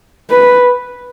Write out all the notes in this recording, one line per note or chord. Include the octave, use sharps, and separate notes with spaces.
B4